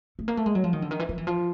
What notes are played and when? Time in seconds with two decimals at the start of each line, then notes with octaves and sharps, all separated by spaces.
0.19 A3
0.28 A#3
0.37 A3
0.46 G#3
0.55 F#3
0.64 F3
0.73 D#3
0.82 D3
0.91 D#3
0.99 E3
1.09 F3
1.18 E3
1.27 F3